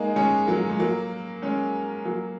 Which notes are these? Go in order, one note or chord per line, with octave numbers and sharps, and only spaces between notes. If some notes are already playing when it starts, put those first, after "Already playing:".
Already playing: G#3 A#3 D#4
G#3 C#4
F#3 A#3
G#3
F#3 A#3
G#3 C#4
F#3 A#3